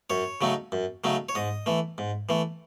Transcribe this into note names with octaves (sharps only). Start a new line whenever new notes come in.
F#2 C#5
C#3 F#3 A3 D#4
F#2
C#3 F#3 A3 D#4
C#5
G#2 D#5
E3 A3
G#2
E3 A3